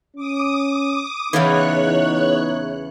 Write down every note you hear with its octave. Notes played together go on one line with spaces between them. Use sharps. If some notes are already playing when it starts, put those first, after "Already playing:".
C#4 D6 D#6
E2 C#3 E3 B3 D#4 C#5 F#6